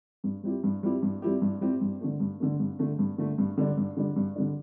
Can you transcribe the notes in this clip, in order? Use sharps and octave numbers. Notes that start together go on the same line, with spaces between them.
G2
G3 C4 E4 G4
G2
G3 C4 E4 G4
G2
G3 C4 E4 G4
G2
G3 C4 E4 G4
G2
D3 A3
G2
D3 A3
G2
D3 A3
G2
D3 A3
G2
D3 G3 D4
G2
D3 G3 D4
G2
D3 G3 D4